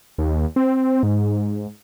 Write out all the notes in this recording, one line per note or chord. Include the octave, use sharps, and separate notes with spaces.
D#2
C4
G#2